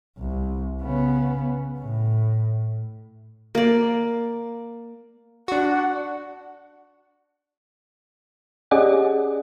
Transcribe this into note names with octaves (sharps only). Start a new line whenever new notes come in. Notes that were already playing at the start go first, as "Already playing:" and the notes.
C2
C#3 B3
A2
A#3 D5
D4 F#4 F#5
C#4 G4 G#4 D5 D#5 F#5